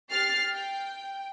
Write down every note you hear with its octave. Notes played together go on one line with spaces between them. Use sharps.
G4 F6 A6 C7
G5